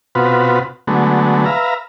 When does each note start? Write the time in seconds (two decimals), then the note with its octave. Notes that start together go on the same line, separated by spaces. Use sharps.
0.15 B2 C4 F4 F#4 B4
0.87 D3 F#3 G#3 A3 B3
1.46 B4 E5 F5 A#5